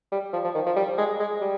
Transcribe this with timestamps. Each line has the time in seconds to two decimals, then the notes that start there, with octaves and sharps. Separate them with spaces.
0.12 G3
0.33 F3
0.44 F3
0.54 D#3
0.66 F3
0.76 G3
0.98 G#3
1.20 G#3
1.41 G3